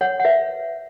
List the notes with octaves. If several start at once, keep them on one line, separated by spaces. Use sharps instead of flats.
C#5 F#5
F#5
B4 E5